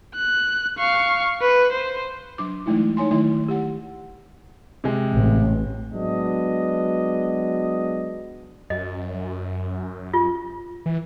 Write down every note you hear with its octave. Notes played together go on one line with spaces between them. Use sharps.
F#6
F5 C#6
B4
C5
F#3 D4 D6
E3 F#3 G#3 A3 D#4 E4
D#4 C#5 G#5 C6
D#3 F#3 A3 E4 C6
G4 F#5
C3 G#3
A1
F#3 G#3 B3 D4 D#5
F#2 D#5
F4
E3